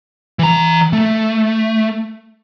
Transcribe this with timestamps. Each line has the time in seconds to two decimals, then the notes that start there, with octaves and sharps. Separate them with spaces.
0.39 E3 A#5
0.93 A3